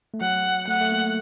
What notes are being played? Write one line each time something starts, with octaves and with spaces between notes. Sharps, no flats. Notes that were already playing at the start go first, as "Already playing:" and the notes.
A3
F#3 F#5
A3 F#5
A3
A#3